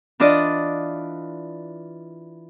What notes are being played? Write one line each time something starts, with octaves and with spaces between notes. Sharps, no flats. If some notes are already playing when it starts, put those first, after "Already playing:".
E3 D4 F4 D5 D#5